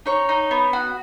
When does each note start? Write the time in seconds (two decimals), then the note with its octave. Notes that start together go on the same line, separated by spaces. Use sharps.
0.06 D#4 C#5
0.29 D#4
0.51 B3
0.73 F#4